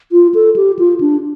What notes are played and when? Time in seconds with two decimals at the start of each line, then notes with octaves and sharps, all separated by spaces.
0.12 F4
0.34 A4
0.56 G4
0.79 F4
1.01 D4